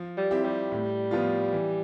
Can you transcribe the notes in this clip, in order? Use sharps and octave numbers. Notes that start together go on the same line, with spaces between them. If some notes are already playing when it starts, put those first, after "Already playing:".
Already playing: F3
G3
C4 E4 G4
G3
A2
F3 B3 F4
E3